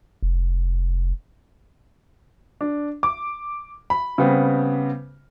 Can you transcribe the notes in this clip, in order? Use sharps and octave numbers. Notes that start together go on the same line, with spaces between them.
F1
D4
D6
B5
C#3 G3 B3 C4